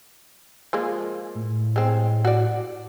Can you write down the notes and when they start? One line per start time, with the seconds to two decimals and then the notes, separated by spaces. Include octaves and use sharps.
0.73 F3 G#3 A#3
1.35 A2
1.76 G#3 C4
2.25 F#4 D5